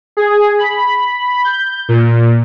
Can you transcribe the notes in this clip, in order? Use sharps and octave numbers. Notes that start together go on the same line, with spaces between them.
G#4
B5
G6
A#2